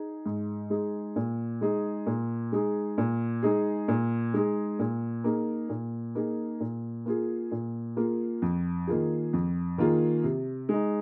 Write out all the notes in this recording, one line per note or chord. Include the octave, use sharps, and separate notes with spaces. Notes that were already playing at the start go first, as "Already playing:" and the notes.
Already playing: D#4 G#4
G#2
G#3 D#4 G#4
A#2
G#3 D#4 G#4
A#2
G#3 D#4 G#4
A#2
G#3 D#4 G#4
A#2
G#3 D#4 G#4
A#2
A#3 D#4 G#4
A#2
A#3 D#4 G#4
A#2
A#3 F4 G#4
A#2
A#3 F4 G#4
F2
D#3 A#3 F4 G#4
F2
D#3 A#3 F4 G#4
C3
G#3 D#4